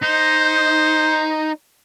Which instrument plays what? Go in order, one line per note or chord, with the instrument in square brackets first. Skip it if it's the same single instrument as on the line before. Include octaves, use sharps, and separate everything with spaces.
[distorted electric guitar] D#4 [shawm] C5